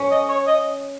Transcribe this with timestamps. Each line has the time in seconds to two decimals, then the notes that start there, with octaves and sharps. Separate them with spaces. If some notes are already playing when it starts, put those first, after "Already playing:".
Already playing: C#4
0.11 D#5
0.29 C#5
0.47 D#5